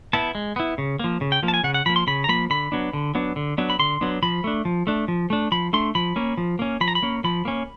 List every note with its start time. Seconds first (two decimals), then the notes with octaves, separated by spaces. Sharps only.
0.13 B3 E4 A5
0.35 G#3
0.56 B3 E4
0.78 C#3
1.00 F3 A#3
1.21 C#3
1.32 G5
1.43 F3 A#3
1.48 A5
1.54 G#5
1.64 C#3 F#5
1.74 F#5
1.86 F3 B5
1.89 A#3
1.96 C6
2.07 C#3 B5
2.24 A#5
2.29 F3 A#3 B5
2.50 D3 B5
2.72 F#3 B3 D4
2.93 D3
3.15 F#3 B3 D4
3.36 D3
3.58 F#3 B3 D4
3.70 B5
3.79 D3 C6
4.01 F#3 B3 D4
4.22 F3 B5
4.44 A3 D4
4.65 F3
4.87 A3 D4
5.08 F3
5.30 A3 D4
5.52 F3 B5
5.73 A3 D4 C6
5.95 F3 B5
6.16 A#3 C#4
6.38 F3
6.59 A#3 C#4
6.81 F3 B5
6.88 A#5
6.95 B5
7.02 A#3 C#4
7.24 F3 B5
7.45 A#3 C#4